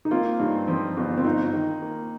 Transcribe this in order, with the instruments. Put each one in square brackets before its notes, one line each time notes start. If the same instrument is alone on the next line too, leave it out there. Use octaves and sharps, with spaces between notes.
[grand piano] D#4
[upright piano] A#3 [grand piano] C4 F4
[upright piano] G2 [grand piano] D#4
[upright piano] F3 [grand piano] C4
[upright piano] G1
[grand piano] C4
[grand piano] D#4 [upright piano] F4
[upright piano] D#3
A#3